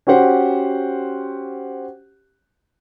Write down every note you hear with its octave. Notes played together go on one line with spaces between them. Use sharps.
C#4 F#4 G4 C5 F#5